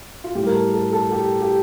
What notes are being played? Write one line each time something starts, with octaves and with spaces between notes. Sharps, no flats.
F4
A2 G3 G4
A#4
A4
A4
A4
G4
G4